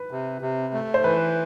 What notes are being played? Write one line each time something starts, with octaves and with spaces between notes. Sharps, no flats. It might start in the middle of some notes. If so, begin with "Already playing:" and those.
Already playing: B4
C3
C3
A3
C5
E3 B4